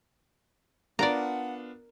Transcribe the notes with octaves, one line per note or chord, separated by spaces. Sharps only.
B3 D4 F4 A#4 D5 F#5 A#5